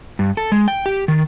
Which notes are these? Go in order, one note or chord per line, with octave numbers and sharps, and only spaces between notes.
G2
A4
G#3
G5
G4
D#3